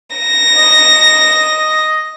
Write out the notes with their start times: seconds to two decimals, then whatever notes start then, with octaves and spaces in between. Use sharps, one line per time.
0.16 A#6
0.57 D#5